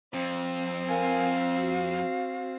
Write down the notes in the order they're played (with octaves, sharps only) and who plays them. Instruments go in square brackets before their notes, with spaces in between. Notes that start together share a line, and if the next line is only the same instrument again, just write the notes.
[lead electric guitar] F2 [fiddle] C4
[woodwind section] A#4 G#5 [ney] F5
[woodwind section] F#4